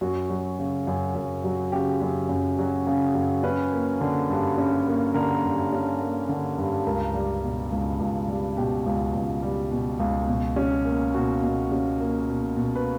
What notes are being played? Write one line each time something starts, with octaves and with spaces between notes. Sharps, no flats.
F#2 F#4
F#3
C#3
F#2
F#2
F#3
C#3 G4
F#2
F#2
F#3
C#3
F#2
C#4 B4
A#3
D3
G2
C#4
A#3
D3 A#4
G2
C#4
A#3
D3
G2
C#2 A#4
G3
B2
C#2
C#2
G3
B2 G4
C#2
C#2
G3
B2
C#2
B2
C#4
A#3
B2 F#4
B2
C#4
A#3
B2
B2
B4